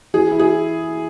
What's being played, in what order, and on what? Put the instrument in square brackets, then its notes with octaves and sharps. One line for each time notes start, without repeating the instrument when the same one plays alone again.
[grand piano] E3 [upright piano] G#4
[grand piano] E4
[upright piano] G#4